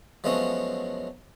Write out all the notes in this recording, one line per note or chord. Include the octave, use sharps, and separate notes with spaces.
F3 F#3 G#3 A3 B3 C#4